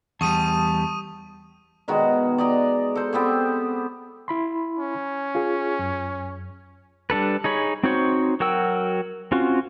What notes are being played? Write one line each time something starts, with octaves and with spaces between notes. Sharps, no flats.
E2 G3 A5 C#6 D#6 D#7
B2 D#3 G#3 F#4
D5 D#5 A#5
A4 C5
B3 C4 G4 C5
E4 B5 C6
C#4
F4 G#4
F#2
G3 D4 A4 B4
D#4 G#4 C#5 B5
C4 D#4 F#4 C5 C#5
F#3 F#4 A#4 G5 E6
C4 C#4 F4 F#4